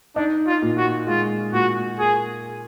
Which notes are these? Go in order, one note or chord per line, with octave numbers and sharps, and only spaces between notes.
D4 D#4
F4
A#2
F#4
G#3 F4
A#2 F#4
A#3 G#4